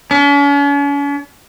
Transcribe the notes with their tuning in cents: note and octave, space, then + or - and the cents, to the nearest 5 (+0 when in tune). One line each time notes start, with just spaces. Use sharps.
C#4 +45